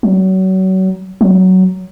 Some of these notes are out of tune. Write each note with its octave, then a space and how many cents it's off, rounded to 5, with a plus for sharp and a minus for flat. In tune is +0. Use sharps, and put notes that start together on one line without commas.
F#3 +30
F#3 +10